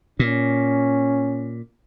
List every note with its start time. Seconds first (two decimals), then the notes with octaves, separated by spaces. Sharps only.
0.19 A#2 C#4